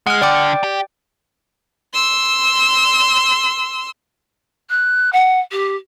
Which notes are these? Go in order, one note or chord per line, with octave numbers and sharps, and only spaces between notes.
G#3 F#5 F6
D3 D5 G5 D6
G4
C6 E6
F#6
F#5
G4